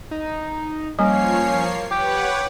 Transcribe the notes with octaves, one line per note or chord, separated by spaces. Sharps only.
D#4
F3 G3 A#3 C#4 C#5 C7
G4 B4 C#5 F#5 G5 D6